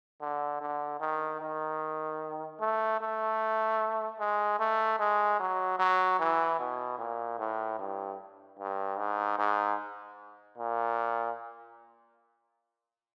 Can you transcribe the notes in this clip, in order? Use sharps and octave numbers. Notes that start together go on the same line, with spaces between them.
D3
D3
D#3
D#3
A3
A3
G#3
A3
G#3
F#3
F#3
E3
B2
A#2
A2
G2
G2
G#2
G#2
A#2